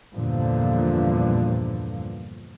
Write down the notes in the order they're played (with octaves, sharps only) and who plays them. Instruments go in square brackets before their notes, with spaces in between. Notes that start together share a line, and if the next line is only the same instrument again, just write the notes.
[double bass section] E2 G2 A#2 D3 F3